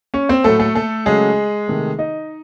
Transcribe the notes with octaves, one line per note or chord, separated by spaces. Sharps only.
C#4 C#5
C4 C5
A2 F#3 A3 A4
A3 A4
A3 A4
C#3 F#3 G#3 A3 G#4
C3 D#3 A3
D#4 D#5